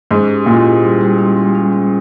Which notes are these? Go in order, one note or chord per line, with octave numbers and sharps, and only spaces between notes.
G#2 C#4
G4
A#2 E4
G4
G3
G3
C#4
G3
C#4
C#4